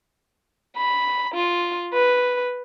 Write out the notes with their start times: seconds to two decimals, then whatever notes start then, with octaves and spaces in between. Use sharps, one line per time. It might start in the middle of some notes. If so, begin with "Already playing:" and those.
0.77 B5
1.34 F4
1.93 B4